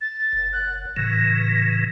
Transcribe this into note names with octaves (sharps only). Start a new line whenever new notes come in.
A6
F#1
F#6
A2 C#3 E3 A#6